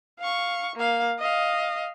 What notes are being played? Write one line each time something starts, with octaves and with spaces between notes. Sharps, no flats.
F5 C#6
A#3 F5
D#5 F5